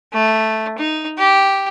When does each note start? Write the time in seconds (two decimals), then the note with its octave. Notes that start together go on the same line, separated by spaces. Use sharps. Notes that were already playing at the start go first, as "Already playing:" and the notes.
0.13 A3
0.78 D#4
1.18 G4